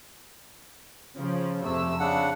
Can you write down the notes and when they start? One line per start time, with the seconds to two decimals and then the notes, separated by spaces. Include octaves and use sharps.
1.17 C#3 F3
1.63 F2 C3 A3 E6
2.00 C#3 D4 F#5